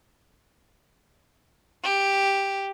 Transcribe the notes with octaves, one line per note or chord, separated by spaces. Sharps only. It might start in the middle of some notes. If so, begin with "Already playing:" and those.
G4